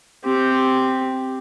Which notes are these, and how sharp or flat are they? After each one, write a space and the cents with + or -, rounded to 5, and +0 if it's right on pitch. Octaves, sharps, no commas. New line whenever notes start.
C4 +0 G4 +0